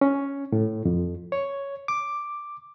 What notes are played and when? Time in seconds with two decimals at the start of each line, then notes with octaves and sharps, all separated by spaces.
0.01 C#4
0.52 A2
0.85 F2
1.32 C#5
1.88 D6